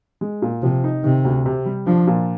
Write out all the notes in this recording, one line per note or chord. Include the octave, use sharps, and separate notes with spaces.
G#3
A#2
C3 F3
D#4
C3 D#3
D2
C3
G3
F3 D4
A#2